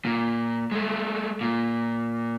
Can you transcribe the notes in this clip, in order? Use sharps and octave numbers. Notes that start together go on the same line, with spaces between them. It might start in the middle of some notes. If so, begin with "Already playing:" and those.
A#2
G#3 A3
A#2